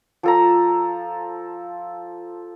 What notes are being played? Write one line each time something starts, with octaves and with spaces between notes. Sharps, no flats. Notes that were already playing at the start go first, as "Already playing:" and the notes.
F3 A4 A#5